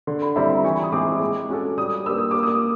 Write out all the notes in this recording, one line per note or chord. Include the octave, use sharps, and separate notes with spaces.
D3 C6
B5
G3 C4 E4 A#5
B5
E3 C#6
D#6
G#3 C4 E4 G#4 D6
G#3
C#4 F#4 A4
G3 D#6
A#3 D4 G4 B4 E6
D#6
A#3 D6
D#6